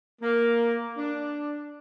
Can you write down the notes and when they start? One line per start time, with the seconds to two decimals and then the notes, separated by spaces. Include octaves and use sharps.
0.22 A#3
0.98 D4